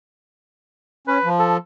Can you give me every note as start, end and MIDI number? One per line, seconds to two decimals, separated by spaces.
1.07 1.18 61
1.07 1.29 71
1.24 1.57 53
1.39 1.57 69